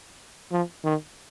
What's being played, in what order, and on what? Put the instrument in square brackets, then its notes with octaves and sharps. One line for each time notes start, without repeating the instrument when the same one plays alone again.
[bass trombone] F3
D#3